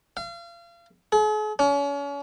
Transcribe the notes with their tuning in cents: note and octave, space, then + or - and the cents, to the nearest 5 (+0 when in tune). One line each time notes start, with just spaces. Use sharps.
F5 -35
G#4 +45
C#4 +35